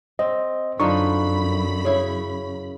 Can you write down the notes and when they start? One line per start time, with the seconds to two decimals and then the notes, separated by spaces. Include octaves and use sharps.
0.19 C4 D#5
0.80 F#2 D3 D#4 F4 B5 C#6
1.85 C#3 E4